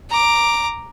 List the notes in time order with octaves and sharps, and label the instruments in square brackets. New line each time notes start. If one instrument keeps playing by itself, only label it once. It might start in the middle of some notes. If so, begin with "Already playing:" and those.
[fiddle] A#5 D6